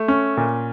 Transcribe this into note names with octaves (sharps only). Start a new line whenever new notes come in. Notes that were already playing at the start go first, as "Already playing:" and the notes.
Already playing: A3
C#4
A#2